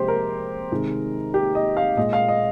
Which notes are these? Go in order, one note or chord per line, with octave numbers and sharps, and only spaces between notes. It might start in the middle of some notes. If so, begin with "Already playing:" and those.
Already playing: C3 F3 G#3 G4 C5
A#4
C3 D#3 G#3
G4
D#5
F5
A#2 G#3 D#5
F5
D#5